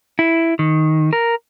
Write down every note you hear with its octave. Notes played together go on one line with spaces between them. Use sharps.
E4
D#3
A#4